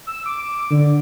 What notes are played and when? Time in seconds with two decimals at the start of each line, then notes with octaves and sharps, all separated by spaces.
0.07 E6
0.26 D6
0.71 D3